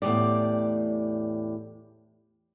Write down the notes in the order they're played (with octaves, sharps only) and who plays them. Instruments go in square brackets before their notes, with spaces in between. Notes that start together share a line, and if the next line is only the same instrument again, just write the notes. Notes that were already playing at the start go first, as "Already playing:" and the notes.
[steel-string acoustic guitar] E2 A2 F3 G4 D5